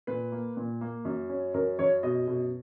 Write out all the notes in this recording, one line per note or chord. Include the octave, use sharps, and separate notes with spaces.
A#2 B4
A#3
A#2
A#3
F#2
C#4
F#2 A#4
F#2 C#5
B2 D#5
B2